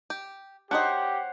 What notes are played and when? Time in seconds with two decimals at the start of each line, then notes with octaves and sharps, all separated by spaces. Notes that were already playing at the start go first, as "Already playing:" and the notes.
0.10 G4
0.71 D4 D#4 G4 C5 C#5 D#5 F#5